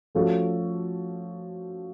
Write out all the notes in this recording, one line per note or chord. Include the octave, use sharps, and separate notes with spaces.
F3 A3 C#4 F#4 A4